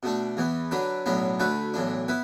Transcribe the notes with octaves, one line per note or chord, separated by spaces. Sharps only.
B2 A3 D4
E2 E3 B3
D3 F#3 D4 B4
B1 A2 F#3 B3 D4
D2 D3 A3 F#4 B4
B1 A2 E3 D4
B3 E4 B4